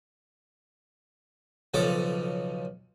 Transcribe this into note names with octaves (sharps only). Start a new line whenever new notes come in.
B1 C#3 F3 A4 D6